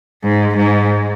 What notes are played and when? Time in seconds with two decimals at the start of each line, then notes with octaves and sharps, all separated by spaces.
0.23 G#2
0.56 G#2